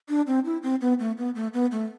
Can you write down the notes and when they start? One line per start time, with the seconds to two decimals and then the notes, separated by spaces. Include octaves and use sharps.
0.09 D4
0.27 C4
0.45 E4
0.63 C4
0.81 B3
0.99 A3
1.18 B3
1.35 A3
1.54 B3
1.72 A3